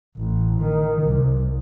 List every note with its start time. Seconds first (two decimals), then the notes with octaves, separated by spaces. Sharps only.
0.17 A1
0.60 D#3
1.03 C2